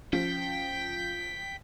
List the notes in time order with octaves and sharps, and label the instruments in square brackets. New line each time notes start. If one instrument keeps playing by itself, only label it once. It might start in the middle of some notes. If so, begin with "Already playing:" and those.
[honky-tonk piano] F3 [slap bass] C#4 [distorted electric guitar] G5 [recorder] B6